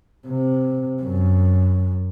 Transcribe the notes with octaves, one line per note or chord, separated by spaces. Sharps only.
C3
F#2